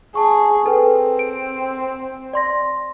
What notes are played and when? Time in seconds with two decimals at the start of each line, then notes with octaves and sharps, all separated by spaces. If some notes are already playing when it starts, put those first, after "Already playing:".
0.15 G#4 A5 C#6
0.66 C4 A4 B4 G5
1.19 D7
2.33 D5 C6 A#6